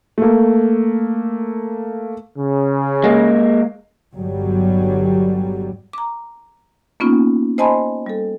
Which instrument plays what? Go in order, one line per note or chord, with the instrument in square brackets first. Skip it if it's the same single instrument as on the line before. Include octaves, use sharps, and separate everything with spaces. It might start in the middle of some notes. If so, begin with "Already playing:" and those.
[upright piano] A3 A#3
[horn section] C#3
[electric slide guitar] G#3 A#3
[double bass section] G1 G2 F#3 G3
[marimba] A#5 D6
A#3 B3 C#4 D#4 F4
C5 D#5 G#5 A5 B5 C6
G3 A4